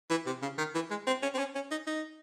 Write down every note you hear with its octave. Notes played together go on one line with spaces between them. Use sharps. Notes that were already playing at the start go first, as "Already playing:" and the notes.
E3
C3
C#3
D#3
E3
G#3
C4
C#4
C4
C#4
C#4
D#4
D#4